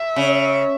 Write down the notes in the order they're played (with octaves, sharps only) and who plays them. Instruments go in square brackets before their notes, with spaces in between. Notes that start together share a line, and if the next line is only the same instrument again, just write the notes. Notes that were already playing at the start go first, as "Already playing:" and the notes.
Already playing: [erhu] E5
[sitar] C#3